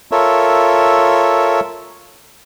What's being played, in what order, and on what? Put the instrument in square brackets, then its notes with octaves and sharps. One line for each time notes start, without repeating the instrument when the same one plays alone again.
[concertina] F4 A4 A#4 C#5 E5